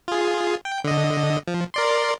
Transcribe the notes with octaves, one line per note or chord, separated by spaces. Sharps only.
F4 G#4
G5
D3 D#5
F3
A#4 D5 C6